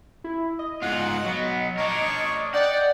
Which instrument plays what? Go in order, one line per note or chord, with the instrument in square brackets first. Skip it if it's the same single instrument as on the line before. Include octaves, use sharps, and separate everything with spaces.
[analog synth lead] E4
D#5
[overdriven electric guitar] G#2 F4 [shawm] F#5
[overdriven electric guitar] F#3 B3
[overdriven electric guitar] D4 A#4 [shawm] C#5
[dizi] D5 [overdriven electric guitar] F#5 [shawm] G5